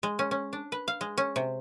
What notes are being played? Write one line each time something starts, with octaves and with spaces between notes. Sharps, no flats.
G#3
C#4
C#4
D4
B4
F5
G#3
C#4
C3